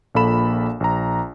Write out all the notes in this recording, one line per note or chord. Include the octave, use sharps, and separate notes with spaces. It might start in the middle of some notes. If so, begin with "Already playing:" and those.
A#1 A#2 A#3 A4 B5 E7
A#1 A#5